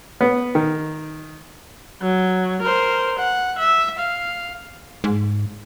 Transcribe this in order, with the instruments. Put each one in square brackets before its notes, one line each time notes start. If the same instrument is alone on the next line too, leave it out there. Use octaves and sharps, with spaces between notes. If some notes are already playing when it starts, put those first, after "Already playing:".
[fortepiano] B3
D#3
[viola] F#3
A#4 C5
F#5
E5
F5
[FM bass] G#2